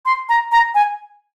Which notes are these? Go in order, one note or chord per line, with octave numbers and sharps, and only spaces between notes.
C6
A#5
A#5
G#5